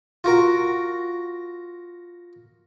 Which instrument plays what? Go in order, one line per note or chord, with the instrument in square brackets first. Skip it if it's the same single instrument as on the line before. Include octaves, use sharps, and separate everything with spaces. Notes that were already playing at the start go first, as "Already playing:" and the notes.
[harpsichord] F4 F#4 A#4